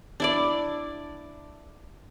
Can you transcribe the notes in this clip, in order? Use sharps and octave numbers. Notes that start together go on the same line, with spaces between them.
D4 E4 D5